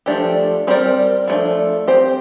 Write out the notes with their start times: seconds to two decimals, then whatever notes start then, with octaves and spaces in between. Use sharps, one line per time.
0.06 F3 A3 D4 G4
0.67 G3 C4 G4 A#4 D5
1.28 F3 A3 D4
1.88 C4 G4 C5